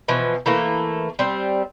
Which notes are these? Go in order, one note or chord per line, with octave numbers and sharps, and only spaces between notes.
B2 E3 F3
E3 A3 A#3
G3 C4